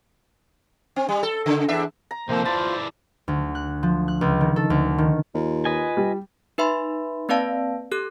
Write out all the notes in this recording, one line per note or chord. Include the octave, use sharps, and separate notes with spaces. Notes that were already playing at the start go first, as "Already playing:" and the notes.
C4
G3
A4
C#3
E2 D4 E5
A#5
C3 D#3 F3 A#3 C4 A4 C5
E4 F4 B4 D5 A5
D2
F#6
F3
F#6
C#2
D#3
A4
D2
D#3
D#2 F4
B4 D#5 G#5
G3
D#4 B4 E5 B5 C6
A#3 C4 B4 D5 F5 A5
G4 A4 F#6